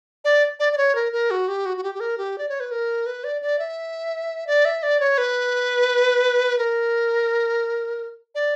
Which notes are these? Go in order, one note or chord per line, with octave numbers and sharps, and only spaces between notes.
D5
D5
D5
C#5
A#4
A#4
F#4
G4
F#4
F#4
G4
G4
A#4
G4
D5
C#5
B4
A#4
B4
D5
D5
E5
D5
E5
D5
C#5
B4
A#4
D5